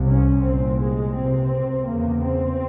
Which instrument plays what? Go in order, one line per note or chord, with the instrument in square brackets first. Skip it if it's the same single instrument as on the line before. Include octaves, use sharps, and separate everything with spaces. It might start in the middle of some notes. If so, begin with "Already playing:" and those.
Already playing: [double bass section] C2 C3
C#4
C2 A#2 C4
G#3
C#2 C3 C4
E2 C#3 A#3
C4